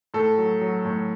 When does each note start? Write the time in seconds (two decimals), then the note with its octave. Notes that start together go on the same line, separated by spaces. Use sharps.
0.14 A2 A4
0.37 F#3
0.61 F#3
0.84 A2